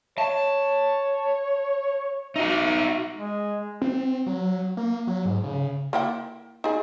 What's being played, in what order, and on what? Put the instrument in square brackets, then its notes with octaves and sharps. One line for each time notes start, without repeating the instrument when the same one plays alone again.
[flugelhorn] C#5 [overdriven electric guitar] A5
[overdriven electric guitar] D#4 F#4 [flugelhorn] E5
[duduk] G#3
[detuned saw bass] C4
F#3
A#3
F#3
G#2
C#3
[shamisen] A#3 E4 G5
D#4 G#4